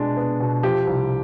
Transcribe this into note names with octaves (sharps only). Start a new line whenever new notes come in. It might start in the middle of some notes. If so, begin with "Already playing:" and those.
Already playing: B2 G#3 D4
B3
B2
F3 G4
C2